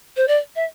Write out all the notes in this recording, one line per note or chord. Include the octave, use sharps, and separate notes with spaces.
C5
D5
E5